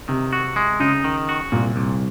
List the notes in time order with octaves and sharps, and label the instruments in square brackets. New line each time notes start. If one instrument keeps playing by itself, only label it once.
[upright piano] C3 [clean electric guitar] D#3
[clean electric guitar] F#4
G#3
[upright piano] C#3 [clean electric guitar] D#4
[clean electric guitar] D#3
F#4
[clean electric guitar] C2 [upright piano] A#2
[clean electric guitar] C2